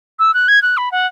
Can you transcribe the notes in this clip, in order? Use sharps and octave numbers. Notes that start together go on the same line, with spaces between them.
E6
F#6
G#6
F#6
B5
F#5